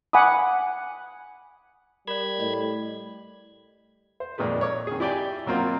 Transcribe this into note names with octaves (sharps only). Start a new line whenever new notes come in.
F#5 G#5 B5 D6 D#6
G3 A#4 D5 B5 G#6
A2 D#5
C5
F2 A#2 D#3 G#3 B4
C#5 D6
D#3 G#4
E4 G4 D5 G5 G#5
B2 F#3 A#3 C4 F4